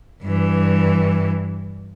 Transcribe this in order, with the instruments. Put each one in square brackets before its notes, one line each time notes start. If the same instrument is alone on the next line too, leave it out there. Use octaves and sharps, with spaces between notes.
[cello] G2 E3